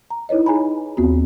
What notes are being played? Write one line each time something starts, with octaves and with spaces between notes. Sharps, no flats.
A#5
D#4 E4 B4 C#5 D#5
D#4 G#4 G#5 A#5 B5
D#2 B3 C4 F4 F#4